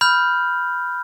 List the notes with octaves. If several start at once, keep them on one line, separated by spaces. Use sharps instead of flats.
B5 F6 G6